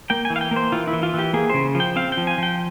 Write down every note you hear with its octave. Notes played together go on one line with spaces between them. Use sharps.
A#3 G5
G#5
E3
F5
G5
A#3
C5
E3 F4
E4
E3
F4
E3 G4
A#3 G#4
C#3 C5
F3
G5
C4 F5
G5
F3
G#5
F3 G5